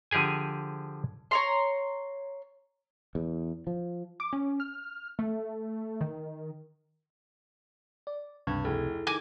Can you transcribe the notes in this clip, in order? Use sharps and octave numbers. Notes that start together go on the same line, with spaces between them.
D3 F3 G4 G#4 G#5
C#5 A#5 C6
E2
F3
D6
C#4
F6
A3
D#3
D5
C#2 G2 C3 C#6 G#6
F1 E4 G#4 A4
D#3 G#5 D6 A#6